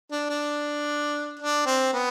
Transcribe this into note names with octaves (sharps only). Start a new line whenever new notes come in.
D4
D4
D4
C4
B3